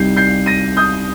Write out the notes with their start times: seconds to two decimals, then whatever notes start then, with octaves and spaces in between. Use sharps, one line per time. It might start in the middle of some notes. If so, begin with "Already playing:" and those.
Already playing: C2 C3 G3 D#4 G6 C7
0.17 G6 C7
0.46 A#6 D#7
0.77 D#6 G6